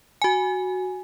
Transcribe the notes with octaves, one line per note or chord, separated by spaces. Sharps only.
F#4 G#5